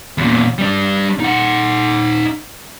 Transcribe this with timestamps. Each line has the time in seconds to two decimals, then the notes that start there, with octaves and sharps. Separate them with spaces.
0.18 E2 A#2
0.58 G3 D4
1.20 D#4 F#5